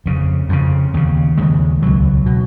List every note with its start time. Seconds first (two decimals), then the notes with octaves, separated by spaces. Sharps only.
0.06 F2 C#3
0.49 F2 C#3
0.94 D#2 C#3
1.37 D#2 C#3 G#3
1.82 C#2 B2 F#3
2.26 B2